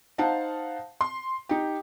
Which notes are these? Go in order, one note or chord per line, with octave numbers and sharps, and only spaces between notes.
D#4 C5 F5 F#5 A5
C6
D#4 G4